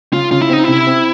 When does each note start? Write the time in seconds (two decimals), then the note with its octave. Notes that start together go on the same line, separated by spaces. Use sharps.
0.13 C#3 F4
0.31 C#3 F4
0.42 E4
0.50 C4 D#4
0.64 C3 E4
0.87 C4